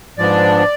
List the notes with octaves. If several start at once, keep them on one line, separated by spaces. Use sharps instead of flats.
G#2 F3 B3 D4 D5